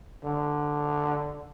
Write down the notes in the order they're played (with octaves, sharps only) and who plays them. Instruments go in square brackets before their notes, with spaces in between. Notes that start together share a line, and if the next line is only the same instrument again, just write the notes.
[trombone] D3